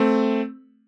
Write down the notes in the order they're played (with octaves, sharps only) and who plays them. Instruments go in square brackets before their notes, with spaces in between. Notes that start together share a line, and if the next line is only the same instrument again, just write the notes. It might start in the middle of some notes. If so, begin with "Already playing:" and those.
Already playing: [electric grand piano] A3 C4